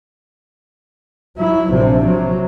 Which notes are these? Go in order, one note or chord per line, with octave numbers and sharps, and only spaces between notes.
F#3 E4
A#1 C3
C3 F#3